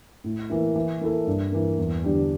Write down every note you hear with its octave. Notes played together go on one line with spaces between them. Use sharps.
A2
E3 A#3 E4
E3
A#3 E4 A4
G2
E3 A#3
E2
D3 G3 D4 G4